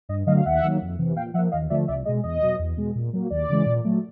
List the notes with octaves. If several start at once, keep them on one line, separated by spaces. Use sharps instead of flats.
G2 D#5
D3 F#3 A3 D#5 F5
F5
D#2 E5 F#5
D#3 F#3 A#3
F2
C3 E3
A#2 F5 G5
F3 A#3 E5 F#5
D#2 D#5 F5
D3 F3 A3 D5 E5
C2 D5 E5
B2 G#3 D#5
E2 D#5
B2 F#3
E2
B2 G#3
A#2
F#3 A#3
D#2 D5
C#3 E3 G#3
A#2
F#3 A3